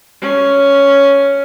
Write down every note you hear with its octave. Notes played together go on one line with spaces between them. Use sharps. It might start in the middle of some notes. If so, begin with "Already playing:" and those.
C#4